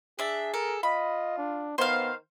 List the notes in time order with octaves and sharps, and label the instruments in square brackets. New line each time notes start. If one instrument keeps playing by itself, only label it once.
[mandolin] D4 E5 [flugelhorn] G#4
[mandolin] A4 [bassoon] A#4
[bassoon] F4 [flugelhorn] D#5 [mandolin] B5
[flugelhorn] D4
[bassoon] D#3 [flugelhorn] B3 [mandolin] C5 F5